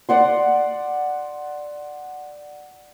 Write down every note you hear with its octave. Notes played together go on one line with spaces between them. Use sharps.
D5 F#5 C6